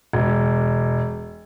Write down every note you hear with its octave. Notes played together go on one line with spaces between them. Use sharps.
E1